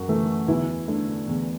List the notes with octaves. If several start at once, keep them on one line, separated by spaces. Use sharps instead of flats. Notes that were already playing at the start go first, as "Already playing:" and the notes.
Already playing: F#2 F#3 F#4
E3 A3
E2 E3 E4
D3 A3
E2